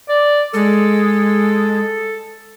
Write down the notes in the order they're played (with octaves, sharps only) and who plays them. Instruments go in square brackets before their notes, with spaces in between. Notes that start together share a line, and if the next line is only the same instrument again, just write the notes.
[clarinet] D5
[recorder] G#3 [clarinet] A4